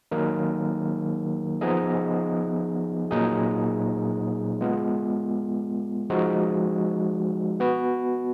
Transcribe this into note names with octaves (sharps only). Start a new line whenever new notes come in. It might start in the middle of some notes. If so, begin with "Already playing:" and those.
D#3 F#3 A#3 D#4 A#4
F3 B3 D#4 G#4 D#5
A#2 F#3 A#3 D#4 G#4
G#3 B3 F4
F3 G#3 D#4 F#4
B3 F#4 B4